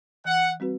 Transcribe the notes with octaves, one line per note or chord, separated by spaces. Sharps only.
E3 F#5
G3 C4 F#4 B4